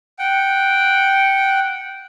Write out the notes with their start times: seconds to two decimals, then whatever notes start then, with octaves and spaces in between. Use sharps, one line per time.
0.19 F#5 G5